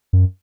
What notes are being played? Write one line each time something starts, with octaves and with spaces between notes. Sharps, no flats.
F#2